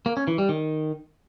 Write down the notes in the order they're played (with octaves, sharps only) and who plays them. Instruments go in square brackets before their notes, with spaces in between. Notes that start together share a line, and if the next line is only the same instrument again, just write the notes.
[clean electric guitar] A#3
C#4
E3
G3
D#3